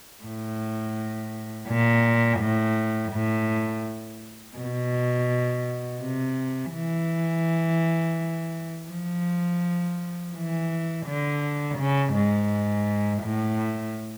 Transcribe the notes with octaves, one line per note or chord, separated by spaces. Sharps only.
A2
A#2
A2
A2
B2
C3
E3
F3
E3
D3
C#3
G#2
A2